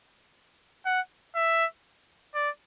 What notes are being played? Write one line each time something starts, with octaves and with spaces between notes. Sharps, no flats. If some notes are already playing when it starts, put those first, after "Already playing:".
F#5
E5
D5